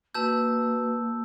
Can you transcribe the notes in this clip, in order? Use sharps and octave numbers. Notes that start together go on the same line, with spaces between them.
A#3 F#4 B4 A5 E6 G6